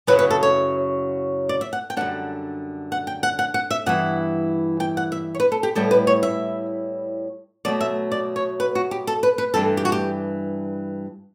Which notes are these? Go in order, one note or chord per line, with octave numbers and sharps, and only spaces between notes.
F#2 C#3 F#3 C#4 E4 B4
B4
A4
C#5
D5
E5
F#5
G5
F#2 D3 G3 D4 F#5
F#5
G5
F#5
F#5
F#5
E5
G2 E3 B3 E4 F#5
G5
F#5
E5
C#5
B4
A4
G4
A2 G3 B3 E4 A4
B4
C#5
E5
B2 F#3 A3 D5
E5
D5
C#5
B4
F#4
G4
A4
B4
B4
G2 E3 G3 D4 A4
G4
F#4
G4